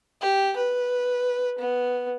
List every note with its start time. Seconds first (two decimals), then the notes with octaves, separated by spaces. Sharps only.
0.21 G4
0.56 B4
1.58 B3